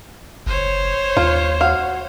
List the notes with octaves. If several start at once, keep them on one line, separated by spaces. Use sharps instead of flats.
F#1 C5 C#5
D#2 F4
F#4 F5